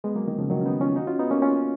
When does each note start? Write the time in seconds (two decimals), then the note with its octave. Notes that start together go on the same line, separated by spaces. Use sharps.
0.04 G#3 B3
0.16 F#3 A#3
0.28 D#3
0.39 C#3 F3
0.50 D#3 F#3
0.61 C#4
0.65 B3 D#4
0.81 C#4 F4
0.96 D#4 F#4
1.07 C#4 F4
1.19 B3 D#4
1.31 A#3 C#4
1.42 C#4 F4